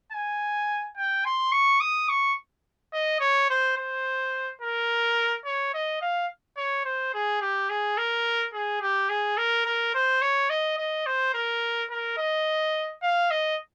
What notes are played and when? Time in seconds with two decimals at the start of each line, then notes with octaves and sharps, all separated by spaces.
0.12 G#5
0.97 G5
1.25 C6
1.52 C#6
1.80 D#6
2.09 C#6
2.93 D#5
3.20 C#5
3.49 C5
3.77 C5
4.61 A#4
5.45 C#5
5.74 D#5
6.01 F5
6.57 C#5
6.85 C5
7.14 G#4
7.41 G4
7.70 G#4
7.97 A#4
8.54 G#4
8.81 G4
9.09 G#4
9.37 A#4
9.65 A#4
9.94 C5
10.22 C#5
10.49 D#5
10.78 D#5
11.06 C5
11.34 A#4
11.90 A#4
12.18 D#5
13.02 F5
13.31 D#5